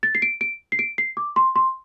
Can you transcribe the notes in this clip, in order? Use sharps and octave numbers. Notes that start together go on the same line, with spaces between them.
A6
C7
D7
D7
C7
D7
C7
D6
C6
C6